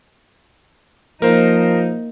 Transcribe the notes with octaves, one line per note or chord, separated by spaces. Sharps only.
F3 A#3 D#4 A#4 C5